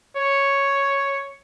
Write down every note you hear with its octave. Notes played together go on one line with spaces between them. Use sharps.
C#5